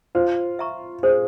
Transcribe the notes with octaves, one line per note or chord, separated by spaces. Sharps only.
F4 C5
E5 A#5 C#6
G#4 C5